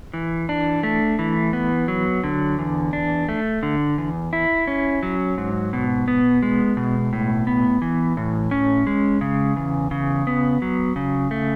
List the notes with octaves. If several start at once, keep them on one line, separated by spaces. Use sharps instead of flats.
E3
D4
A3
E3
B3
F#3
D3
E2
D4
A3
D3
E2
E4
C#4
F#3
G#2
B2
B3
G#3
B2
A2
B3
E3
A2
C#4
G#3
C#3
E2
C#3
B3
F#3
C#3
A3